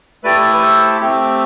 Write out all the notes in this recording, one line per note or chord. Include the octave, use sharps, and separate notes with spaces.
A3 E4 G4 B4 D5
B4
A4 C5
A3 C4 G4